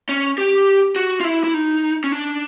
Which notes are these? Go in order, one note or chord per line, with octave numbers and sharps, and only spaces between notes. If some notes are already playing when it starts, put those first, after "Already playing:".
C#4
G4
F#4
F4
E4
E4
D#4
C#4
D4